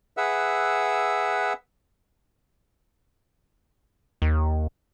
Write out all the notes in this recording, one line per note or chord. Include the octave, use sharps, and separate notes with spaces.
G#4 B4 E5 F#5 E6
D#2